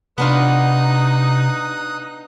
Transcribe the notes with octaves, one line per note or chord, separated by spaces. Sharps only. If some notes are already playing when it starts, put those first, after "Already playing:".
C3 B3 D4 D#4 F4 D#6 F#6